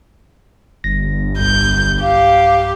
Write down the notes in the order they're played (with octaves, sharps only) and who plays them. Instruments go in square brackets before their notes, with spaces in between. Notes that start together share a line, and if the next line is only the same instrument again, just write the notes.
[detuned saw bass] G1 [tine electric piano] A#6
[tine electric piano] B1 G2 [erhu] G6
[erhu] G4 [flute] F5